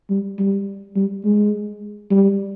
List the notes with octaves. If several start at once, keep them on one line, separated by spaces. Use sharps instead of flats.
G3
G3
G3
G#3
G3